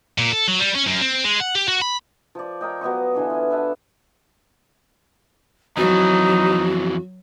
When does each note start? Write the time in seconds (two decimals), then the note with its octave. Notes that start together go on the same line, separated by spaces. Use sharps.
0.18 A#2
0.32 A4
0.48 F#3
0.60 G3
0.75 C#4
0.87 F#2
1.02 C4
1.24 G#3
1.40 F#5
1.55 G4
1.68 F#4
1.81 B5
2.35 F3 D5
2.61 A#4 C#5 D#5 G5
2.81 F#3 B3 D#5 C#6
3.15 D3 E3 D4
3.30 F4 G#5
3.50 B4 E5 F#5 A5
5.77 F2 E3 F#3 D#4 F#4